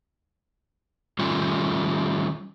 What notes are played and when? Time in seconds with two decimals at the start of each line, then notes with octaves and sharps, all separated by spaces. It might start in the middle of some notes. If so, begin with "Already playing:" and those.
1.19 D#3 G3 A3 C#4 F4